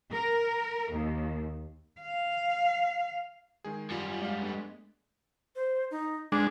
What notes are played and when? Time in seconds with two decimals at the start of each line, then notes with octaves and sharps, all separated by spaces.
0.13 A#4
0.93 D#2
2.01 F5
3.64 D#3 G#3 G#4
3.91 F#2 G3 F4
4.04 G#5
4.22 G#3 D5 F5
4.42 A3 B3 D4
5.56 C5
5.91 D#4
6.32 G#3 D4 D6